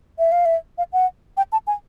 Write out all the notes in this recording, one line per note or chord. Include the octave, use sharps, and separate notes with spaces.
E5
F5
E5
F5
F#5
G5
A5
G#5